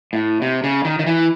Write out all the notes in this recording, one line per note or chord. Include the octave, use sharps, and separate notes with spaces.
A2
C3
C#3
D#3
D#3
E3